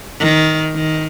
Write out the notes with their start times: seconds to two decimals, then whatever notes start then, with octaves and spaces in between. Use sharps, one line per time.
0.20 D#3
0.75 D#3